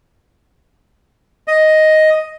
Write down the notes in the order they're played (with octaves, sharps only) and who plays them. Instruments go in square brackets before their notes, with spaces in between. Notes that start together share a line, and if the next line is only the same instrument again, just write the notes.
[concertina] D#5